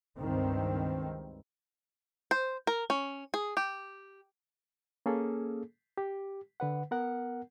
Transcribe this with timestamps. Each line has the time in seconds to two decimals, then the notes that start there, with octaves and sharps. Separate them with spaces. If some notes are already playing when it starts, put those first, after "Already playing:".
0.19 C#2 G2 D#3 C4
2.31 C5
2.67 A#4
2.90 C#4
3.34 G#4
3.57 G4
5.06 A#3 C#4 G#4 A4
5.98 G4
6.60 D3 B4 F#5
6.91 B3 A#4 F#5